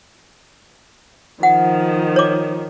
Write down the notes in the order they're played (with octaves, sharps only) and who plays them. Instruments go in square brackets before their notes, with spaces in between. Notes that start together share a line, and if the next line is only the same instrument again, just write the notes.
[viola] D#3 F3 [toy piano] F#5
[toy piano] C#5 D6